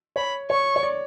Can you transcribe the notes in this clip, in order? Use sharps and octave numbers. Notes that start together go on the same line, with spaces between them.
C#5 B5
C#5 C#6
C#5
D5